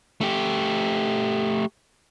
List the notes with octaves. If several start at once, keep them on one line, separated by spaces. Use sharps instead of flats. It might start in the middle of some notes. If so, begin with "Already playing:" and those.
A3 G4